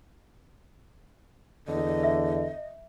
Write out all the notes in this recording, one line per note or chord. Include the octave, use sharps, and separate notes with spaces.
E2 D3 D#5
E5